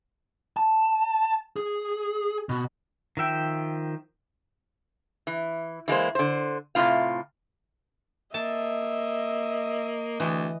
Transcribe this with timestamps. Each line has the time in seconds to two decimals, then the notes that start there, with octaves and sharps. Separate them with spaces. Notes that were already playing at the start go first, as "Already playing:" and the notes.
0.57 A5
1.56 G#4
2.49 B2
3.17 D#3 F3 E5 G5
5.27 E3
5.88 E3 G#3 A#3 C5
6.15 D3 C5
6.75 A2 C3 G3 B3 F4 F5
8.34 A#3 D#5 E5 A5
10.20 D2 E3